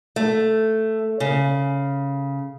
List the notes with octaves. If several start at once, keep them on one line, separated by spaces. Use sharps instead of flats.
A3
C#3